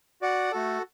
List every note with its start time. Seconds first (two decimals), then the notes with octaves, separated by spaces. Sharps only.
0.21 F#4 D5 F#5
0.52 A3 F#4 A4